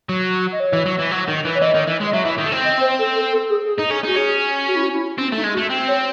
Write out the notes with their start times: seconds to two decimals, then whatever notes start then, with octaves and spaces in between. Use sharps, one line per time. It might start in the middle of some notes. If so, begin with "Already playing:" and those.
0.09 F#3
0.52 D#5
0.60 C#5
0.73 E3
0.86 F#3
0.99 E3
1.11 F#3
1.28 D#3
1.45 E3
1.55 C#5
1.62 E3 D#5
1.75 D#3
1.88 E3
2.01 G#3
2.07 D#5
2.14 F#3 E5
2.25 E3
2.38 D#3
2.46 A3
2.52 C4
2.64 D#5
2.81 C5
2.99 A4
3.16 A4
3.32 A4
3.50 G#4
3.66 G#4
3.79 D#4
3.91 C#4 G#4
4.04 D#4 F#4
4.17 C#4 G#4
4.68 F#4
4.76 E4
4.83 F#4
4.94 E4
5.19 C4 C#4
5.32 A3 D#4
5.44 G#3
5.53 F#4
5.57 A3
5.70 C4
5.88 C#5